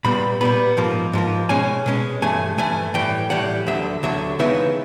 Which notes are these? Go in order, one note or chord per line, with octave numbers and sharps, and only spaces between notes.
A#2 G3 B3 B5
A#2 G3 B3 B5
G#2 F3 A#3
G#2 F3 A#3
B2 G#3 C#4 G#5
B2 G#3 C#4
G2 E3 A3 G#5
G2 E3 A3 G#5
A2 E3 G3 G5
A2 E3 G3 F#5
D2 D3 F#3 E5
D2 D3 F#3 E5
C#3 E3 G#3 B3 D#4 E5